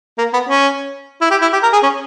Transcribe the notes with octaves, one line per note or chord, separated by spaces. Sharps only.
A#3
B3
C#4
E4
G4
E4
G4
A#4
G#4
C#4